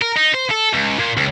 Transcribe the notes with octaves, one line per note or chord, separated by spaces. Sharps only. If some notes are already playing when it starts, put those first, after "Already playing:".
A#4
D#4
C5
A4
C#2
A#2
C#2